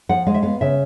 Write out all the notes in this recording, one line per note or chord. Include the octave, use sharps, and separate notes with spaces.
F3 F#5
G#3 F5
E5
B3 F5
C#3 E5